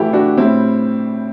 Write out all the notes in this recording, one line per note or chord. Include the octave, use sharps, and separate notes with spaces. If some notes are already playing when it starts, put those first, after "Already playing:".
Already playing: A2 E3 A3 E4 F#4 G4 A4
D4 F#4
A2 G3 C4 E4